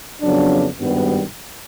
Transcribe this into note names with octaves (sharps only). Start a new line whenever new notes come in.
F2 C#3 F#3 B3 D4
G#1 G2 D#3 G3 B3